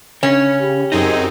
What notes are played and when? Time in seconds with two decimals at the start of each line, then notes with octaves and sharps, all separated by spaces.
0.23 C#3 C#4
0.61 G4
0.92 F#2 C4 D#4 G#4 D#5